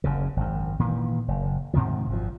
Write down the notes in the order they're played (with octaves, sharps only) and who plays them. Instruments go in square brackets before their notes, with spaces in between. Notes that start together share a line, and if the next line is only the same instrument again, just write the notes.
[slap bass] F#1 F#2 C#3
G#1 F#2
A#2 D#3 E3
F#1
G#2 C3 D#3 F3
G#1 F#2 F3